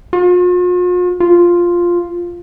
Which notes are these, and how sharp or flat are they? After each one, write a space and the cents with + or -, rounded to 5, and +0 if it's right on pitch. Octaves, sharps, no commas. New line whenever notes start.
F4 +45
F4 +0